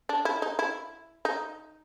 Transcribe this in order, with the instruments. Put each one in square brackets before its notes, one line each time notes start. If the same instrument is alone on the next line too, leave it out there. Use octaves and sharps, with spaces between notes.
[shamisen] D4
E4
D#4
E4
D#4